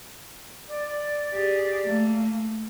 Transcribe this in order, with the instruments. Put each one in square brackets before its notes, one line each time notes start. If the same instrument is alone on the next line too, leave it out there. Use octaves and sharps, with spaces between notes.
[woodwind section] D5
[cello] G4 G#4
A3 A#3